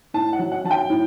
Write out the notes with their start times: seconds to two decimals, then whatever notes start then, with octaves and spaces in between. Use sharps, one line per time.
0.14 A2 A5
0.33 F#5
0.39 F#3
0.52 F#5
0.64 F#3 A5
0.71 G5
0.90 A2